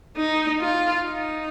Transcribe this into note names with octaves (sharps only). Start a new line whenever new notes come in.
D#4
F4
D#4